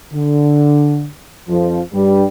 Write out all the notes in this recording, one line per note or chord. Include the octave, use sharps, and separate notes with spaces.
D3
F2 F3
G2 G3